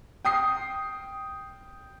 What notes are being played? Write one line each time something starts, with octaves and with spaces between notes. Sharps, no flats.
G5 D#6 C7